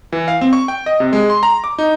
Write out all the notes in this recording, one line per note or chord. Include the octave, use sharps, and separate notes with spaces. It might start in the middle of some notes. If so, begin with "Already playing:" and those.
E3
F5
C4
C#6
G5
D#5
C3
G#3
C6
A#5
D6
D#4